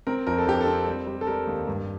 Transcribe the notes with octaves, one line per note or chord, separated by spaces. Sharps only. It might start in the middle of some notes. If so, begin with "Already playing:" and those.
C4 A#4
F2 A#4
A4
F2 G4
A4
C4
G3
G3
A4
G3 A#4
D#2
G2